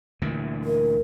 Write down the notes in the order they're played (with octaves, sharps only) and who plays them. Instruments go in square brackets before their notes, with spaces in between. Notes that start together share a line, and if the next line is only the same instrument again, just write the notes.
[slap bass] D2 A#2 E3
[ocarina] A#4